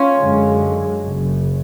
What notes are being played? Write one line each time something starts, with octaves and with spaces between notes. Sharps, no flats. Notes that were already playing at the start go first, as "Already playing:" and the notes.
Already playing: C#4 F4
F#2 D3 G#3
F#1 F#2 C#3